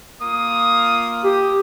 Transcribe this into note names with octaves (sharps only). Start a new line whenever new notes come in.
A#3 F4 D#6
G4